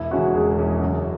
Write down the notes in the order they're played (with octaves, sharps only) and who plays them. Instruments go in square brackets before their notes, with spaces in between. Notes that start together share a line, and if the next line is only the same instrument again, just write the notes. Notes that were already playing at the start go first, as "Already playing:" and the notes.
Already playing: [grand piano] E1 [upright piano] E4
[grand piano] E2 C#3 G#3 C#4 [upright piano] F#4
[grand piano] E1 [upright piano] G#4
[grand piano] E2 C#3 G#3 C#4
F#2